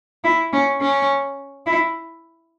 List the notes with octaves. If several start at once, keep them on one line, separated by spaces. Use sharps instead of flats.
E4
C#4
C#4
E4